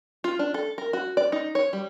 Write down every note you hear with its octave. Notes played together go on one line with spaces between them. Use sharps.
F4
D4
A4
A#4
F#4
D5
D#4
C#5
G3